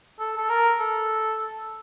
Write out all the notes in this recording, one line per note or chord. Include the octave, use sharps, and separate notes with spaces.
A4
A4
A#4
A4